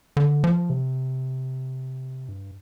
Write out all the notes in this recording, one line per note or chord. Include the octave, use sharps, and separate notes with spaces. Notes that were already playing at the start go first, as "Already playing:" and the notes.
D3
F3
C3
G2